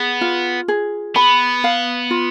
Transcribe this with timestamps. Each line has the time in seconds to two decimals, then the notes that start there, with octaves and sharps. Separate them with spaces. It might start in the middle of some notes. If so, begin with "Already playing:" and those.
Already playing: B3 G#4
0.21 F4
0.68 G#4
1.16 B3 B5
1.64 F5
2.11 F4